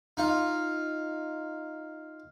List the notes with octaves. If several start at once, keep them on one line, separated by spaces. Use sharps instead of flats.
D#4 F4